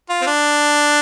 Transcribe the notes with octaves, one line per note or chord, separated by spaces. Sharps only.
F4
C4
D4